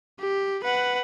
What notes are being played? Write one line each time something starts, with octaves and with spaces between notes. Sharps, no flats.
G4
B4 F#5